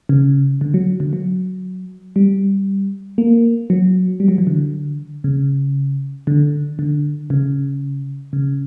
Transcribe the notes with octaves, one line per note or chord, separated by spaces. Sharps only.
C#3
D3
F#3
D3
F#3
G3
A#3
F#3
G3
F#3
E3
D3
C#3
D3
D3
C#3
C#3